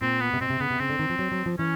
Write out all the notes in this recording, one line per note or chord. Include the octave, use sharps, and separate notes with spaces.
A#2 C4
B3
C3
B2 C4
C3
C#3 B3
C3
C#3 C4
D3
D#3
F3
F#3
F#3
F3
E3 C#4